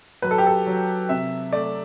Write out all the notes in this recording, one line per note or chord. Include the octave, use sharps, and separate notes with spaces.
F#3 B4
A4
G4
A4
F#3
C3 E5
A3 D5